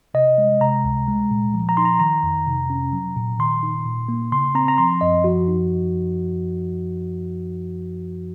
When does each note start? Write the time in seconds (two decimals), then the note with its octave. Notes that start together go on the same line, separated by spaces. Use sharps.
0.14 C3 D#5
0.38 G#3
0.61 C3 A#5
0.85 C#2
1.08 G#3
1.31 A#2
1.54 F3
1.69 A#5
1.77 D#4 C6
1.85 A#5
2.00 D#3 A#5
2.23 F2
2.47 C3
2.70 C#4
2.93 F#3
3.16 A#2
3.39 D#3 C6
3.63 D#4
3.86 A#2
4.09 A#3
4.32 C#3 C6
4.55 C4 A#5
4.68 A#5
4.78 F3 C6
5.01 F#2 D#5
5.24 F3 F#4
5.48 D#4